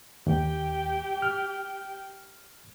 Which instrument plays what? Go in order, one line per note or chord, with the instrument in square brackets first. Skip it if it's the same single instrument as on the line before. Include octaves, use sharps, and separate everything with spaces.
[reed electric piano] D#2 [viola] G4 G5
[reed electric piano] F6